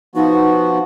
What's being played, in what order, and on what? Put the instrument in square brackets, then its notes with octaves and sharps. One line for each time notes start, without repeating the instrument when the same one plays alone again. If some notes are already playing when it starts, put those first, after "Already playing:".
[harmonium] F3 B3 F#4 [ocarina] D#4